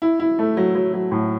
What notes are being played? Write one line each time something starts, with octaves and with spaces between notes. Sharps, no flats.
E4
E4
A3
F#3
F#3
F#3
A2